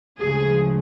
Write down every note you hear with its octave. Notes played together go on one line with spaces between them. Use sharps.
D2 C#3 F3 G#3 G#4